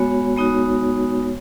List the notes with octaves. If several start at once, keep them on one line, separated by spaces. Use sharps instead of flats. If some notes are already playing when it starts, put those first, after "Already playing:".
Already playing: G#3 B3 F#4 C#5
G#3 B3 D#4 F#4